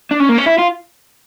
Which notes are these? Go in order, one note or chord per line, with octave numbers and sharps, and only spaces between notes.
D4
C#4
A#3
C#4
E4
F4